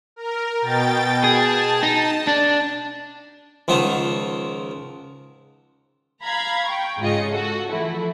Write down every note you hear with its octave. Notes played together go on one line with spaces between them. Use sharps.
A#4
B2 G5 A6
G#4 A5
D#4
D4
C#2 D#3 F3 F#5
F5 A#5 B5 G#6
G5 C#6
G#2 C#3 F4 D#5 C#7
F#4 A4
E3 F3 A3 E4